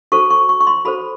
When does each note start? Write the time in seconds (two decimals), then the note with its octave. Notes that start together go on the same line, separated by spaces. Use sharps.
0.12 F#4 A4 C5 C#6
0.30 C#6
0.49 C#6
0.60 C#6
0.67 C6
0.85 F#4 A4 C5 B5